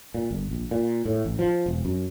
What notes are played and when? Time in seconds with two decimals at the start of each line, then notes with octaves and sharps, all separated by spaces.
0.14 A#2
0.31 G1
0.51 A#1
0.71 A#2
1.05 A2
1.25 A1
1.39 F3
1.66 E1
1.85 F#2